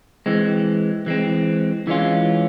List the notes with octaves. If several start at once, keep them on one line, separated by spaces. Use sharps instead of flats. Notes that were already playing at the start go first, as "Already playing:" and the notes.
E3 G#3 C4
E3 G#3 C4
E3 G#3 C#4 F4